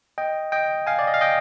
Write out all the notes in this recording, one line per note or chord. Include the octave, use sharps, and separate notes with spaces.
D#5 G5
D#5 G5
F5 G#5
D5
D#5
F5
D#5 G5